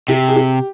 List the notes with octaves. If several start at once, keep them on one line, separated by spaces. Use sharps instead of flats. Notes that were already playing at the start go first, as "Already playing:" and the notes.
C3 G4
G#4
G4